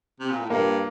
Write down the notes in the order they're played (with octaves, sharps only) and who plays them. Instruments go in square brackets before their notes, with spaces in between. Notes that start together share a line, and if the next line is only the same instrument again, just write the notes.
[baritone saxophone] C3
A#2
A2
[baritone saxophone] G2 [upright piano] A#3